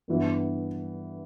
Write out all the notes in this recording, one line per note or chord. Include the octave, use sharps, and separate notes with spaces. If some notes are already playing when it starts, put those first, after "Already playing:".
G2 E3 B3 E4